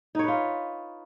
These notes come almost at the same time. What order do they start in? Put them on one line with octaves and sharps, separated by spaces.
D#4 C#5 B4 F4